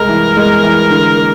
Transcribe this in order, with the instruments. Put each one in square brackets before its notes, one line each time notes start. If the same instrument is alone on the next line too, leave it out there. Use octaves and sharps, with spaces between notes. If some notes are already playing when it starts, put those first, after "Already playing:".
Already playing: [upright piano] C2 G#3 [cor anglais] A#4
[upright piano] E3
G#3
E3
D3
A#3